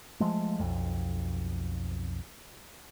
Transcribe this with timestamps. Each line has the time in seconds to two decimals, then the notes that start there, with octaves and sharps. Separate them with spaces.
0.20 F3 G#3 A3
0.60 B1 F2